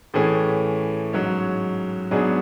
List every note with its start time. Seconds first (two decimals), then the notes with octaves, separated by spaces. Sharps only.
0.14 A2 E3 A3 C#4 G#4
1.13 G#2 F#3 C#4
2.11 G#2 F#3 B3 D4 G#4